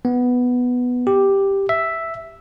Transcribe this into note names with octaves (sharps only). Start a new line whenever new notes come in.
B3
G4
E5